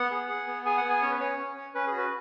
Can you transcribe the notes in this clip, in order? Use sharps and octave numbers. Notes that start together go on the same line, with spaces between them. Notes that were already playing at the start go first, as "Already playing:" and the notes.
Already playing: B3 F#5
G#4
G#4
B3
G#4 G#5
F#5
B3
G#5
C#4 C#5
B4
C#4 C#5
C#4
C#4
C#4 B4
F#4 G#4
B4